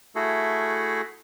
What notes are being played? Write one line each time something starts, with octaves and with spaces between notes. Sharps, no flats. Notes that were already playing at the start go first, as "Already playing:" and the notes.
A3 E4 F#4 G#4 A4